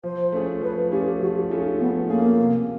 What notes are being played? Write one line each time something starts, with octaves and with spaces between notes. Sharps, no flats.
F3 C5
A3 C#4 F4 G#4
F3 B4
A3 C#4 F4 G4 G#4
F3 F#4
G4
A3 C#4 E4 F4 G#4
D#4
F3 B3
A3 A#3 C#4 F4 G#4
C3